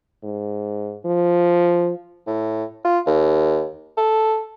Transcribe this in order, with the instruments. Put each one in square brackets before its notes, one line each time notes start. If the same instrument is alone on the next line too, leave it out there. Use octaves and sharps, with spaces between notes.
[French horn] G#2
F3
[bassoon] A2
F4
D#2
A4